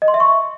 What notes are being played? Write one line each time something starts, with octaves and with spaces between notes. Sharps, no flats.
D#5
C6
E5
C#6